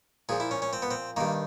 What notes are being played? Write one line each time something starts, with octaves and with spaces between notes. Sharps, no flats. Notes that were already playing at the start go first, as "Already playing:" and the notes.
A#2 F3 G#4
E4
C#4
C#4
C4
B3
C4
G2 D#3 A#3